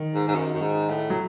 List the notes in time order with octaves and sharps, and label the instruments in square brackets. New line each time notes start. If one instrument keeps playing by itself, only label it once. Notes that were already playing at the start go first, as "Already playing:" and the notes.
Already playing: [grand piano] D#3
[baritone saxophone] G#2
G#2
F#2
F#2
G#2
A2
[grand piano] F#3